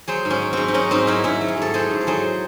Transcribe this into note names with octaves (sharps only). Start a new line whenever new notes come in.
F#3 G#4 C5
G#2
C#4
F#3
G#2 C4
D#4
F#3 C#4
G#2 C4 D#4
F#3 C#4 E4
G#2 C#4 E4
F#3
G#4
G#2 A4
F#3 G#4 C5
G#2
A4
F#3 G#4 C5